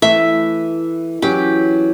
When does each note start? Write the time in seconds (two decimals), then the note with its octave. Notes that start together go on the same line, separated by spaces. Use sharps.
0.02 E3 A3 E5
1.22 E3 F#3 C#4 G4